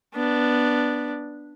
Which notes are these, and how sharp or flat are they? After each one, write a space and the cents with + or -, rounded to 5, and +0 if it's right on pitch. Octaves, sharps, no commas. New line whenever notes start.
B3 -5 D4 +0